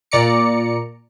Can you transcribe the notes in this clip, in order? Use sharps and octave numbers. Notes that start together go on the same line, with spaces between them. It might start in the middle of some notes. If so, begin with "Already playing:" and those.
A#2 D5 A#5 D6 C#7